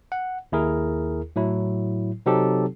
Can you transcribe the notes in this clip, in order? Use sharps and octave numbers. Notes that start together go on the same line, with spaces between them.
F#5
D#2 E4 G#4 A#4
A2 F#3 E4
C3 F#3 C4 D#4 G4 A4